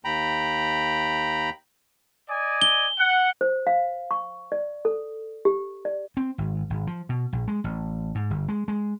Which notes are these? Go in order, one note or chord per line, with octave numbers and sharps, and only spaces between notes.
D#2 G5 A#5 B5
D5 D#5 G#5
G7
F#5
C5
F5
C#6
D5
A4
G4
D5
C4
G#1
G#1
F3
B2
A#1
G#3
A1
G#2
G1
G#3
G#3